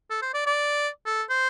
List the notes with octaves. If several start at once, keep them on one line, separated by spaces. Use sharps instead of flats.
A4
C5
D5
D5
A4
C5